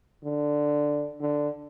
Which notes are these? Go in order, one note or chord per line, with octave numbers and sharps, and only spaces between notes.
D3
D3